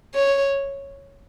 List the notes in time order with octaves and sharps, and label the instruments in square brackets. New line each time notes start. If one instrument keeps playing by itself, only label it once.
[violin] C#5